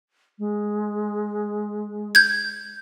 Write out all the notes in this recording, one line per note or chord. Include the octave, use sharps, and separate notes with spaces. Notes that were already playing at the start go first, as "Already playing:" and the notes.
G#3
G6 G#6